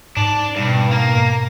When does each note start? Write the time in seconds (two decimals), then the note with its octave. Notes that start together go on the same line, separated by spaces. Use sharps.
0.17 G#2 D4
0.56 G2 B2
0.91 A#3